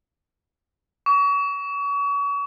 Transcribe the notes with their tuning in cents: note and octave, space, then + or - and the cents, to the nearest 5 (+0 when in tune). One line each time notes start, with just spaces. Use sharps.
C#6 +35